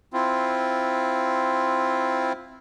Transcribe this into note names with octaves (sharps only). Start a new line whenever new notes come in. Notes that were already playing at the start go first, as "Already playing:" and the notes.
C4 E4 F4